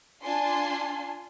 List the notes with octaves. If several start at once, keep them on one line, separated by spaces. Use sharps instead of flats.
D4 F4 G#5 A5 C6